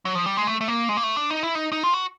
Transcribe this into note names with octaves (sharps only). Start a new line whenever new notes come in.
F#3
F3
G3
G#3
A3
A3
A#3
G#3
A#3
A3
D4
D#4
E4
D#4
D#4
F4
F#4